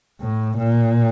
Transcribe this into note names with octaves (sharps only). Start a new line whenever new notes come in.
A2
A#2